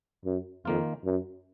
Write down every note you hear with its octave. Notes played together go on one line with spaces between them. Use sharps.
F#2
F2 D#3 A#3 F4
F#2